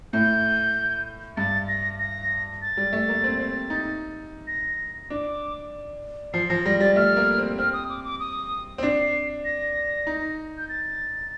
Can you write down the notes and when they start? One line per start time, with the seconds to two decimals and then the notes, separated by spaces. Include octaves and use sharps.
0.13 A2 G6
1.37 G2 A6
1.68 A#6
1.99 A#6
2.62 A6
2.77 G3
2.93 A3
3.08 A#3
3.24 C4
3.39 C4
3.70 D#4
4.47 A#6
5.10 D4 D6
6.34 F3 C7
6.49 F3 A#6
6.65 G3 A#6
6.80 G3 A6
6.96 A3 F6
7.16 A#3
7.38 C4
7.58 C4 F6
7.73 D#6
7.90 D6
8.05 D6
8.20 D#6
8.78 C4
8.83 D4 C7
9.45 A#6
10.07 D#4
10.58 G6
10.69 A6